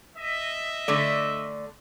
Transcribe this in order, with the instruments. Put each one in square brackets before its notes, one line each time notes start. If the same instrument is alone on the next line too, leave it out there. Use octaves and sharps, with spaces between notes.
[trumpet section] D#5 E5
[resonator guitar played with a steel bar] D3 A3 D5